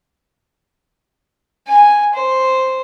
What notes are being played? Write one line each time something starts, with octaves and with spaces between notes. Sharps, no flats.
G#5
C5